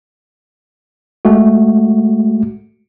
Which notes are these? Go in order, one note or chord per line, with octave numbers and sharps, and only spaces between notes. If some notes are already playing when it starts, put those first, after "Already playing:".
G#3 A3 F#4